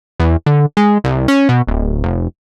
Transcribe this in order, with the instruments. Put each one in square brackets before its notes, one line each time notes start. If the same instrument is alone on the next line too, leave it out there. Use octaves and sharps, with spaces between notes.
[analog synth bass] E2
D3
G#3
C2
C#4
B2
D1
F1